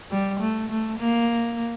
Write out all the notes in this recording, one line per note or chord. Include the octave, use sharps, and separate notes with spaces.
G3
A3
A3
A#3